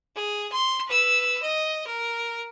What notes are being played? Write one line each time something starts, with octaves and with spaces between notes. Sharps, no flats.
G#4
C6
B4 E6
D#5
A#4